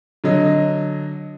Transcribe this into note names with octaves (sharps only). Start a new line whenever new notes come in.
D3 F#3 D#5